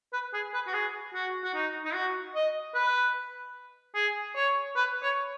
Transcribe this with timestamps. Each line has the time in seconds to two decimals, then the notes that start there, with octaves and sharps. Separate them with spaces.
0.13 B4
0.34 G#4
0.54 B4
0.67 F#4
0.73 G#4
1.14 F#4
1.44 F#4
1.54 D#4
1.85 D#4
1.94 F#4
2.35 D#5
2.75 B4
3.95 G#4
4.36 C#5
4.75 B4
5.02 C#5